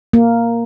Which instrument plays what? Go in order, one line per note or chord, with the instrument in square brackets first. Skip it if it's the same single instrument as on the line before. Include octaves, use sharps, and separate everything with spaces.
[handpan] A#3